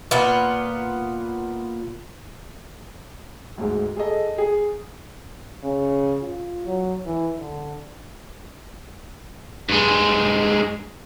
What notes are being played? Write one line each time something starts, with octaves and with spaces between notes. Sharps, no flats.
A#2 B3 F4
D2 G#2 G#3
G#4 A4 D#5
G#4
C#3
F4
F#3
E3
D3
G2 G#3